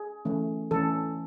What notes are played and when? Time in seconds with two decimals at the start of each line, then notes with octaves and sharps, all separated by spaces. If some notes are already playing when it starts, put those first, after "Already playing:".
Already playing: G#4
0.25 E3 A3 C#4
0.71 E3 A3 C#4 A4